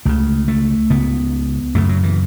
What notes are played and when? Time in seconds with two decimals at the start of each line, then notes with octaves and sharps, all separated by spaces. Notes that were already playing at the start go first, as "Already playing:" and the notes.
0.05 C#2 C#3 A3
0.48 A3
0.90 C#2 C#3 B3
1.75 F#2 C#3 A3
1.89 F#3
2.03 E3